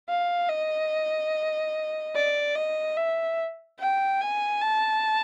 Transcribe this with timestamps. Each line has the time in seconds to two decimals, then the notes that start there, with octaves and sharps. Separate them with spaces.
0.09 F5
0.50 D#5
2.15 D5
2.56 D#5
2.97 E5
3.79 G5
4.21 G#5
4.61 A5